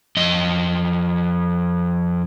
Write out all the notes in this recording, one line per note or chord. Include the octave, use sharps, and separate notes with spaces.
F2 D#5